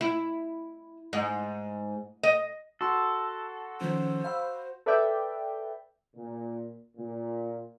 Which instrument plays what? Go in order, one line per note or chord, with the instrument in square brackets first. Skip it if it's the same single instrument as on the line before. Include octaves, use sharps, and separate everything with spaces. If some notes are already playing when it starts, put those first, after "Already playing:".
[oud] E4
G#2
D#5
[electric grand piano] F#4 C6 [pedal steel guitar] A4
[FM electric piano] D#3 F3 C#4 [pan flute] C5
[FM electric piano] F5 B5 E6
[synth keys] A4 B4 D5 E5 G5
[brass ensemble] A#2
A#2